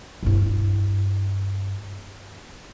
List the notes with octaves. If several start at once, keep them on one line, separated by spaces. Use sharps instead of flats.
G2 E4